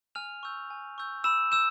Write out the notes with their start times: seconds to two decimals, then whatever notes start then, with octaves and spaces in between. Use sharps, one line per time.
0.15 G#5 F6 F7
0.43 C#6 E6 G6
0.70 G#5
0.98 C#6 E6 G6
1.24 B5 E6 E7
1.51 E6 G6 E7